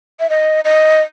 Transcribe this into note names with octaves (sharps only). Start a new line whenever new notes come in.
E5
D#5
D#5